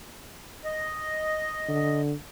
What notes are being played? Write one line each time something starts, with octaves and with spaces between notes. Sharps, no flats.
D#5
D3